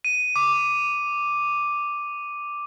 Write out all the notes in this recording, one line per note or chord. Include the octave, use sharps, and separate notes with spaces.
D#7
D6